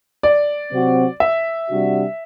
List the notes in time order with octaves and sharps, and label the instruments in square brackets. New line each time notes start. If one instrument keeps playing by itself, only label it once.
[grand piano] D5
[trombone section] C3 F#3 C4 F#4
[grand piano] E5
[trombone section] C3 G3 D4 F#4